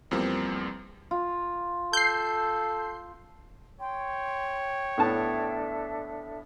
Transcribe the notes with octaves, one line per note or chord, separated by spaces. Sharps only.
E2 F3 G3 A#3 C4
F4
A4 G6 C7
C#5 G5 C6
A2 B3 D4 A4 E5 A5